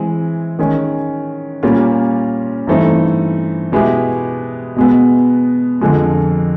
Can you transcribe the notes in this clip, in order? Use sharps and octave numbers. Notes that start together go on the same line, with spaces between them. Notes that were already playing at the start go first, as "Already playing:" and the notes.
Already playing: E3 G#3 C4
D#3 G#3 C#4
A#2 G3 A#3 C#4 F4
G2 E3 A3 C4 D#4
B2 G#3 B3 E4 G4
B2 G#3 B3
F2 D3 F3 G#3